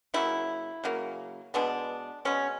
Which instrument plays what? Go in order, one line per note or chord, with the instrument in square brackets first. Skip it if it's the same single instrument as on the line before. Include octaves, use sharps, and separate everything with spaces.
[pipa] C#3 F#3 A#3 E4
C#3 F#3 A#3
B2 G#3 B3 D4
B2 G#3 B3 C#4